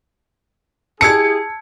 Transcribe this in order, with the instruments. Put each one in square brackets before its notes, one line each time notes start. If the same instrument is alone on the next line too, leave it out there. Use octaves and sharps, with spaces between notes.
[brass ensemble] E4 G4 G#4 [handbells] A5 E6 G#6 [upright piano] C#7